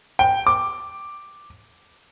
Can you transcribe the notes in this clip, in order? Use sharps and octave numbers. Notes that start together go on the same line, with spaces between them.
G5
D6